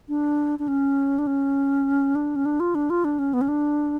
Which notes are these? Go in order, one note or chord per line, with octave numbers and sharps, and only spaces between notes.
D4
D4
C#4
D4
C#4
D4
C#4
D4
F4
D4
F4
D4
C#4
B3
C#4
D4